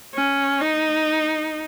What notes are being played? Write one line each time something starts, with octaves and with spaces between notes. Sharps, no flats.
C#4
D#4